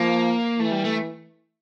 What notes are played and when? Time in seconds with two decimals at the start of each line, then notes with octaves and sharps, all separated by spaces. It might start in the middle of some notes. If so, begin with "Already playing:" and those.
Already playing: F3 A#3
0.60 E3 A3
0.71 G3
0.85 A3